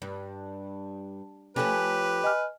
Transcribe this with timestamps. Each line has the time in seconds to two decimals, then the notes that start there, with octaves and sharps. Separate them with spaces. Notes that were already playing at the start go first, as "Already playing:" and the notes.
0.02 G2
1.56 F3 A3 C#4 G4 B4
2.24 D#5 G#5 F6